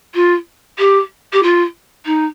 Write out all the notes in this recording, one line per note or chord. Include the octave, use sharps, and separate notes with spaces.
F4
G4
G4
F4
D#4